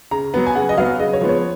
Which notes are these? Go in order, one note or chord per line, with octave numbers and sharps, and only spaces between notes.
C#3 A#5
F#3 B3
G#5
C#3 F#5
D#5
F#3 B3 F5
C#3 D#5
C#5
F3 G#3 B3
C#5